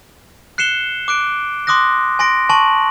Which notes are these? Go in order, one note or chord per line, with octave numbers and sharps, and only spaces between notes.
F#6 C7 C#7 E7 G7
D6 F#6 D7
C6 D6 D#6 F#6 A#6
G#5 C6 A#6 D7
G#5 A5 C#6 F#7